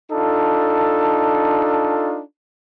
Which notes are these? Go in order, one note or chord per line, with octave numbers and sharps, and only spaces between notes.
D4 D#4 F4 A4